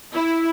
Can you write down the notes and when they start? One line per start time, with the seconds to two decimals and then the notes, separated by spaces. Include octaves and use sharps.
0.13 E4